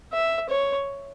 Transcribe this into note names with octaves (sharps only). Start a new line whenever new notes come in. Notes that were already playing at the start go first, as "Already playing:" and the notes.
E5
C#5